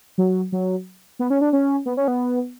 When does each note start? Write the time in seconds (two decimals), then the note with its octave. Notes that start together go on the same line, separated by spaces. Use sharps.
0.18 F#3
0.52 F#3
1.19 B3
1.30 C#4
1.41 D4
1.53 C#4
1.86 B3
1.97 C#4
2.08 B3